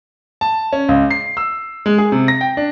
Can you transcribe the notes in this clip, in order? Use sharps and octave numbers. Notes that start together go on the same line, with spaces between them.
A5
C#4
C#2
C7
E6
G#3
G#4
C3
A#6
G5
D4